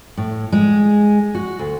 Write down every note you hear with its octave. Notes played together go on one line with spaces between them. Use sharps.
A2
G#3
F#4
D2